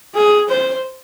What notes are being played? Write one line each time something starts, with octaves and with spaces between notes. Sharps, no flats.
G#4
C5